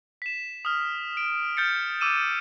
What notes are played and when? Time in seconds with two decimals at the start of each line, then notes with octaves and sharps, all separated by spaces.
0.22 B6 E7
0.65 D#6 F6
1.17 D7
1.57 F6 G6 A6 C#7
2.01 D6 E6 D#7 E7